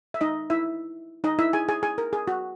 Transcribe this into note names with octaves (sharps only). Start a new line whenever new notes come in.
E5
D#4 D#5
E4 E5
D#4 D#5
E4 E5
G#4 G#5
G#4 G#5
G#4 G#5
A#4
G#4
F#4